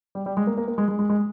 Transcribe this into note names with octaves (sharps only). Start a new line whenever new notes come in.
G3
G3
G#3
A#3
A#3
A#3
G#3
G#3
G#3
G#3